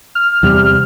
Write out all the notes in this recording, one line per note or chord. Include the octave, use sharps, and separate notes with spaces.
F6
E2 C3 G3